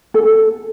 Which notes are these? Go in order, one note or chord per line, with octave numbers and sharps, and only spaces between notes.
A4